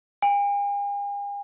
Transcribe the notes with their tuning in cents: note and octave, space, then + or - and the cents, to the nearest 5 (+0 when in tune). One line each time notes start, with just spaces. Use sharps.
G#5 -45